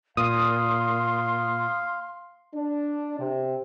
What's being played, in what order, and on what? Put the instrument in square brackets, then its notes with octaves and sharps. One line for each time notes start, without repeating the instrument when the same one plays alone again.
[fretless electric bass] A#2 [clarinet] F5 [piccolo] C6 [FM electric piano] D#6
[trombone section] D4
C3